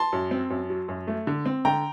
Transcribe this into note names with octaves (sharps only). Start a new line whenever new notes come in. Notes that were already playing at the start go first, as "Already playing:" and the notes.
Already playing: A5 C6
F#2
C4
F#2
F#3
F#2
A3
D3
C4
D3 G5 A#5